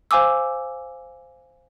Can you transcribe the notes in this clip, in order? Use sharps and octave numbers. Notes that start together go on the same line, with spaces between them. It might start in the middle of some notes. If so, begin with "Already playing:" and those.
C5 F5 G#5 D6 E6